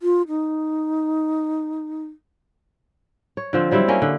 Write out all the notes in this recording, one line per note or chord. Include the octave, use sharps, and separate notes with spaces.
F4
D#4
C#5
D3 F3 C4
F#3 G3 C4 E4
A#3 C#4 D5
D3